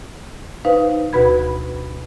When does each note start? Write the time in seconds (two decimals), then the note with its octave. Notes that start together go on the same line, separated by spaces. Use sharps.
0.65 D#4 B4 C5 F5
1.13 D2 B2 F#4 B4 B5 G#6